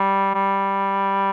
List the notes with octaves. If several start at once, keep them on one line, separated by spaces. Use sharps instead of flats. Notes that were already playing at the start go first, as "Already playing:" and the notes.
Already playing: G3
G3